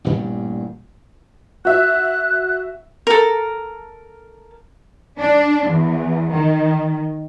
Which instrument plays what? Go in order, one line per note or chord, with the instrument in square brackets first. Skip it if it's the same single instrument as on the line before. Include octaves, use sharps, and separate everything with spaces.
[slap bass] A1 G2 A#2 G3
[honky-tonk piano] F#4 E5 [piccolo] F#6
[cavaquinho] A4 A#4
[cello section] D4
E2
D#3